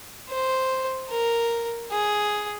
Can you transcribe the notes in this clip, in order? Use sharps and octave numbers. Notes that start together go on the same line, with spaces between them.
C5
A#4
G#4